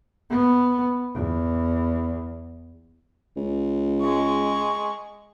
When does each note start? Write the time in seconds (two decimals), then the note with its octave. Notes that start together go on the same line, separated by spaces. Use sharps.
0.30 B3
1.15 E2
3.36 C#2
4.02 G#3 C#6